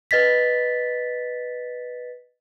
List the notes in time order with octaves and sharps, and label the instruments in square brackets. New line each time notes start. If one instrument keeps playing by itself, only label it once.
[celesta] B4 D#5 A6 B6